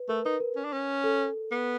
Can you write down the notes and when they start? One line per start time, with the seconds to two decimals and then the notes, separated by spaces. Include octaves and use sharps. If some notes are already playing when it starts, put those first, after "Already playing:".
Already playing: B4
0.09 A3 A#4
0.25 D#4 B4
0.40 A#4
0.56 C#4
0.64 D4
0.73 C#4
1.04 A4
1.52 B3